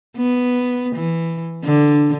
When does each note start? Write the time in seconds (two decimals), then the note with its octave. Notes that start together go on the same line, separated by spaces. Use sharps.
0.17 B3
0.95 E3
1.64 D3